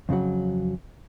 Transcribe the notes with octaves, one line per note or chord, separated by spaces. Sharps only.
F2 C#3 F3 F#3